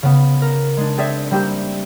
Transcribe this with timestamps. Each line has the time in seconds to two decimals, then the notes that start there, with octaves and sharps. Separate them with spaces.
0.03 C#3 B3
0.42 A#4
0.77 G#3 D4
0.97 C4 G#4 D5 E5
1.31 G3 A#3 C4 G4